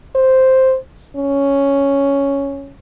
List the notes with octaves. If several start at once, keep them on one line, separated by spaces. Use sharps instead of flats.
C5
C#4